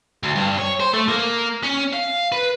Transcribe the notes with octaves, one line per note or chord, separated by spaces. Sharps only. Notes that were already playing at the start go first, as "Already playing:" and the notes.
D2
G2
C#5
C5
A3
A#3
C#4
F5
B4